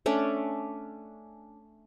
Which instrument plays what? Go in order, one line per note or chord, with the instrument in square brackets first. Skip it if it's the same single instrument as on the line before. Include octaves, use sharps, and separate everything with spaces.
[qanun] A3 C#4 D4